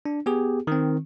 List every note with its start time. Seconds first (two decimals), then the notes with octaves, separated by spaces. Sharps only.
0.06 D4
0.26 B3 G4 G#4
0.67 D#3 C4